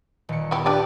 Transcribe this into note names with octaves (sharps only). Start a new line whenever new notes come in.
D#1 C#7
B3 E4 G4
D4 G4 B4 D5 D6